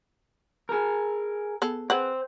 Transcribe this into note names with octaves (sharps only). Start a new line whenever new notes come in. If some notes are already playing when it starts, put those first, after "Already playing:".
G#4 A#4
B3 G#4 A4
G#4 B4 C5 F#5 G5